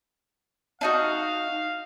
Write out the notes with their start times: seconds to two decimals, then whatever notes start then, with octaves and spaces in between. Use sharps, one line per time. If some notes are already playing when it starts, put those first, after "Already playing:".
0.81 D4 D#4 F#4 F5